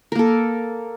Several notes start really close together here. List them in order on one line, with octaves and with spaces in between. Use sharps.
A#4 A#3 A4